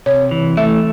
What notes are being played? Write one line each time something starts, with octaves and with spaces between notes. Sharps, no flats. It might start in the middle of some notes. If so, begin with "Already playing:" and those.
C3 C#5
E3
A3 E5